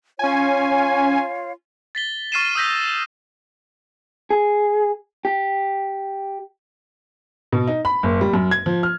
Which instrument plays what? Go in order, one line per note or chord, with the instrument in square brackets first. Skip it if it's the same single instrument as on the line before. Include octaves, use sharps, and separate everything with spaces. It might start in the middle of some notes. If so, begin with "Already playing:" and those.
[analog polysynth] C#4 G#5 [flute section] F4 C#5 F5
[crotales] A6 B6 G7
C#6 F6 A6 C7 D#7 E7
D#6 E6 G6 A#6 B6
[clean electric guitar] G#4
G4
[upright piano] B2
D#4
B5
F#1
G3
F#2
G#6
F3
F6